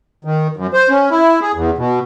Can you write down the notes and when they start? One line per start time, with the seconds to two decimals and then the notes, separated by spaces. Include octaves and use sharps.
0.25 D#3
0.57 F#2
0.73 C5
0.90 C#4
1.11 E4
1.42 G#4
1.55 E2
1.78 B2